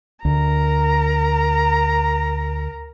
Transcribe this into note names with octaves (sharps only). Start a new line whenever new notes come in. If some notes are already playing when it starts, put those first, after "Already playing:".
D2 A#4 A#5